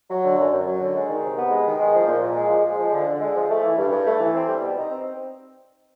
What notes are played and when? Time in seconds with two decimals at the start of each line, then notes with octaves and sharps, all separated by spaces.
0.10 F#3
0.24 D3
0.38 F#2
0.52 F#2
0.66 F#3
0.81 D3
0.95 G#3
1.09 D#3
1.23 C3
1.37 B3
1.51 G#3
1.66 D#3
1.79 G#3
1.94 F3
2.08 A#2
2.22 A#2
2.36 G#3
2.50 F3
2.64 G#3
2.79 F3
2.92 D3
3.07 D3
3.21 G#3
3.35 F3
3.50 A3
3.63 E3
3.78 G2
3.91 G2
4.06 A3
4.20 E3
4.35 C4
4.48 G3
4.62 B2
4.77 D#4
4.91 C4